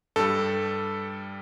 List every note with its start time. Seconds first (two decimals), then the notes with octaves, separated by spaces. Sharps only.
0.16 G2 G3 A4